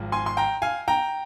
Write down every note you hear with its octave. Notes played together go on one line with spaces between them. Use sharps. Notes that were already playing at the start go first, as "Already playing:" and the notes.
Already playing: G#1 G#2 F3
G#5 C6
C6
G5 A#5
F5 G#5
G5 A#5